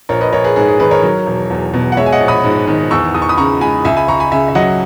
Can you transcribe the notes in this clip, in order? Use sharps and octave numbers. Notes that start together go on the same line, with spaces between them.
A#1 A#4 C#5
B4 D#5
A#1 A#4 C#5
G#4 B4
G#2 G#4
G#4
D#3 G#4 B4
A#4 C#5
F#3
E1
E2
B2
F#5
G#3 C#5 E5
G#5
D#5 F#5
A#1
B5 D#6
G#2
D#3
E2 C#6 E6
E2 D#6
C#6
B5 D#6
C#3 A#5 C#6
G#3 G#5 B5
C#2 E5 G#5
G#5 B5
C#2 A#5 C#6
G#5 B5
C#3 E5 G#5
E5
F#3 D#5 F#5